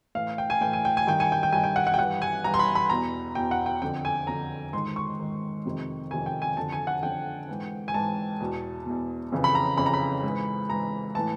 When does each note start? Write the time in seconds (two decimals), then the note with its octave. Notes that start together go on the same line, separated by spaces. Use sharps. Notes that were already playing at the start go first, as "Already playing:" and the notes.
0.15 A2 E3 F5
0.38 G5
0.50 G#5
0.61 A2 E3 G5
0.73 G#5
0.85 G5
0.97 G#5
1.07 G2 D#3 G5
1.20 G#5
1.32 G5
1.43 G5
1.53 G2 D#3 G#5
1.64 G5
1.76 F#5
1.87 F#5
1.94 G5
1.98 G2 E3 F#5
2.22 G#5
2.44 G2 E3 A#5
2.54 C6
2.59 B5
2.75 B5
2.90 E2 B2 A#5
3.35 E2 B2 G5
3.51 F#5
3.66 G5
3.82 F2 D3 G5
4.05 G#5
4.27 F2 D3 A#5
4.73 G#2 D#3 C6
4.96 C#6
5.19 G#2 D#3
5.65 F2 C3 D#3
6.11 F2 C3 D#3 G#5
6.26 G5
6.42 G#5
6.57 F2 D3 A5
6.72 G#5
6.87 F#5
7.03 F2 D3 G5
7.49 G#2 E3
7.88 G#5
7.94 G#2 E3 A5
8.40 E2 B2
8.86 E2 B2
9.32 F2 C#3 E3
9.44 B5
9.55 A#5
9.78 F2 C#3 E3 B5
9.86 A#5
9.94 B5
10.23 G#2 E3
10.69 G#2 E3 A#5
11.15 A2 E3 A5